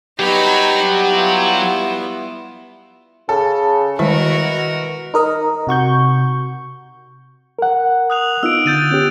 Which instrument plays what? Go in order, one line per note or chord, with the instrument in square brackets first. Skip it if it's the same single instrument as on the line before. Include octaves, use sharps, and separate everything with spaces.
[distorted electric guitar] F#3 [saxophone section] G3 B3 [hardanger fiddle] D#4 B5 [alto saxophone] G4
[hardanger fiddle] E4 F4
[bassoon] C#3 [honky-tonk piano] A4
[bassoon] B2 [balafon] D#3 G3 G#3 [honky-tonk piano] E4 [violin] F#4 A#4
[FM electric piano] D#4 A#4 D#5
C3 F#4 C#6 G6
[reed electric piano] A#4 F#5
[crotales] D#6 F#6 F7
[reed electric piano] B3 D#4 F4 [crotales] E6 D7
[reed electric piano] D3 [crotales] G6 A6 D#7
[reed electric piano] B3 C#4 G4